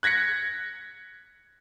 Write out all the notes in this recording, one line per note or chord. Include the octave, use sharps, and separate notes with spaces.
F#6 G#6 A#6 B6 C#7